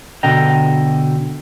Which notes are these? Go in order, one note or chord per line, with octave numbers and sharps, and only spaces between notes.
B2 D3 D#5 G5 A#5